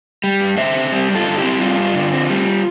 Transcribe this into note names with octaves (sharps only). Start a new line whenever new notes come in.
G3
G2
D3 C5 E5
C4
G3
G2
F4 A4
D3
E4 G4
C4
G3 F4
G2
D3
C4
G3